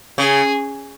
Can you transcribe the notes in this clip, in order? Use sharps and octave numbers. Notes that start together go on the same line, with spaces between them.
C#3 G#4